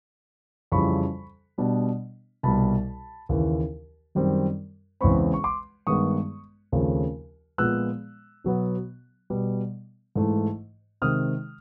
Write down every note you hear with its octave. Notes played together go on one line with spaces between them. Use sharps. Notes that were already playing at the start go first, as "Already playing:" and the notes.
F2 C#3 E3 G3 B5 C#6
B2 G3 B3 D4
C2 B2 G3 A5 B5
D#2 C#3 E3
F#2 D#3 G3 C4
E2 C#3 E3 G#3 C4 B5 C#6
C#6
C6 D6
G2 D#3 G#3 B3 C#6 D#6
D#2 C#3 F3 A3 C4
A#2 F3 G#3 B3 E6 F#6
B2 F#3 B3
B2 G3 B3
G#2 E3 A3
C3 D#3 G#3 D#6 F6